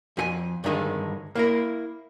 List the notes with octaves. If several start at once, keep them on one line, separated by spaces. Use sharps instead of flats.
F2 G#4 G#5
G2 D3 D#3 G#3
A#3 E4 A#4